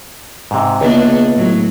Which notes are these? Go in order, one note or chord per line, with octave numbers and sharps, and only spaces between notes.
G#2 C3
C#2 A#3 B3 D4 E5
A2 F#3